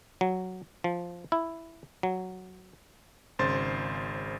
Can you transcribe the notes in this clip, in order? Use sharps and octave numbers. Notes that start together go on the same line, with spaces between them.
F#3
F3
E4
F#3
G#1 C#3 C5 C6 A6